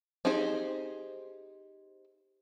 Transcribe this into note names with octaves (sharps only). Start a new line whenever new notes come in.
C4 D#4 G4 G#4 C5